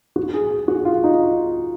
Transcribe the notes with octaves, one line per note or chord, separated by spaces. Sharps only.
F#4
G#4
G#4
F#4
F4
D#4